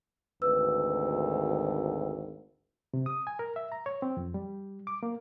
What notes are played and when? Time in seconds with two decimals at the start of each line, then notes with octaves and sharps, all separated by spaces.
0.42 G#1 D2 B4 E6
2.94 C3
3.06 D#6
3.27 G#5
3.39 A#4
3.56 E5
3.72 A#5
3.86 C#5
4.02 C4
4.17 F2
4.34 G3
4.87 D6
5.03 A#3